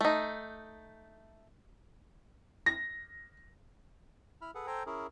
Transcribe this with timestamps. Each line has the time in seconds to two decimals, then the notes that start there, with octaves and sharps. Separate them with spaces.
0.01 A3 D#4
2.66 A#6
4.42 E4 B5 F6
4.55 G#4 A4 B4 F#5
4.67 A4 C5 G5 G#5 A#5
4.86 C#4 E4 G#4 A#4